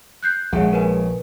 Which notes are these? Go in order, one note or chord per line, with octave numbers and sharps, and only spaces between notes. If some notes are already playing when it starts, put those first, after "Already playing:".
F#6 G6 C7
A#1 C#3 G#3 E5 F#5
A#4 B4 G#5